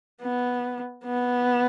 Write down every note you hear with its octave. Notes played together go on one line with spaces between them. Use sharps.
B3
B3